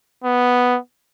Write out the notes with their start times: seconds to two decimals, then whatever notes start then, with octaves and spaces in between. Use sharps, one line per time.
0.24 B3